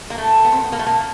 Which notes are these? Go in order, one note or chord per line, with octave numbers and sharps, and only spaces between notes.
A#3
A3
B3
C4
B3
A#3
A3
A#3